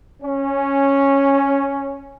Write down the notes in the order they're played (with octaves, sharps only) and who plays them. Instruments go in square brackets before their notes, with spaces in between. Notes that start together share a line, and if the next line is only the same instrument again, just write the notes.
[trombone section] C#4